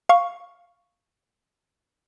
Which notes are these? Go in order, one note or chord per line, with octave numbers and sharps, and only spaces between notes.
F5 C#6